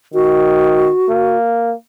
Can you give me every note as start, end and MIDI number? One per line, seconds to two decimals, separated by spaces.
0.14 0.89 51
0.14 1.37 66
1.09 1.74 58